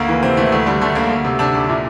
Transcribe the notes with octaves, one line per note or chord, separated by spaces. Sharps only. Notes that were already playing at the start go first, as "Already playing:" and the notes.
Already playing: D2 A#3
E3
C3 C4
E3 A3
D2 A3
D3 G3
D3 A3
D2 A#3
D2
C3
C3 D4
D2
A#2 E4